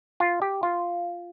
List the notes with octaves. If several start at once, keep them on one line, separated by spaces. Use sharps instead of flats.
F4
G4
F4